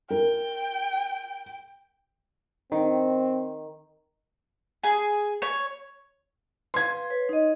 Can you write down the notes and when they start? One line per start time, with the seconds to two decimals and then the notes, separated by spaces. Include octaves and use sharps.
0.11 A#4 G5
2.72 D#3 C4
4.84 G#4
5.42 C#5
6.74 B4 F5 C6 G#6
7.10 B4 C#5
7.29 D#4 D#5